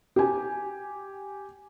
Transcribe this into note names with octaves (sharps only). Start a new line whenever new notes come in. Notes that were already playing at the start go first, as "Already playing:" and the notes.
G4 G#5